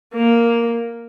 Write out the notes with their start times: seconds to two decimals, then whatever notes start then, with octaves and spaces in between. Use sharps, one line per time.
0.14 A#3